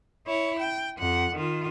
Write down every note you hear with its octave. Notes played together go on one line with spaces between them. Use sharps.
E4 C#5
G5
F2 F#5
D#3 F4